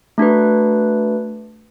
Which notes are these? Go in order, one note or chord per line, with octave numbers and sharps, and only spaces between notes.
A3 D4 F#4 B4